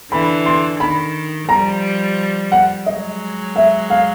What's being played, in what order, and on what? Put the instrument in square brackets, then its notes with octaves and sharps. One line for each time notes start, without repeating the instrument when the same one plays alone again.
[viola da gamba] D3 E3 [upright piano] B5
[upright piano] C6
[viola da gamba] D#3 [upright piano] B5
[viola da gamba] F3 G3 [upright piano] A#5
[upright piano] F#5
[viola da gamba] F#3 G#3 [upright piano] D#5
[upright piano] E5
F5